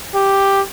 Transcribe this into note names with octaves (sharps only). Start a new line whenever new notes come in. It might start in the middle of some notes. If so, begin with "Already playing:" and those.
G4